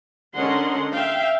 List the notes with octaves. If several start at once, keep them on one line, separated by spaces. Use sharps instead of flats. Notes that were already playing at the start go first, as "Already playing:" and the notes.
D3 C#4 A#4 D#5 F#5 C6
E5 F5 G5